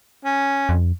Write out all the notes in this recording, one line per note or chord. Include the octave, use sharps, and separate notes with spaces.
C#4
F2